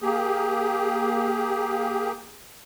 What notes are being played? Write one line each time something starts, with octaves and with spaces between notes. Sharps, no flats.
A#3 G4 G#4